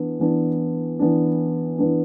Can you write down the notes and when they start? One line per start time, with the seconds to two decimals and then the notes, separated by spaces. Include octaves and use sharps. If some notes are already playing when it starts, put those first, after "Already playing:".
Already playing: E3 B3 D4
0.20 E3 B3 D4
0.99 E3 B3 D4
1.78 E3 B3 D4